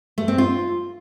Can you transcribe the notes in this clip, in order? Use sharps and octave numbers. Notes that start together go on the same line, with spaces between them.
A3
C4
F4